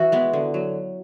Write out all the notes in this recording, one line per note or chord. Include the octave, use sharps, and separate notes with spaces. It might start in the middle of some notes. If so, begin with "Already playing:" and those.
Already playing: E3 E4 F#4
G#3 B3
D3
F#3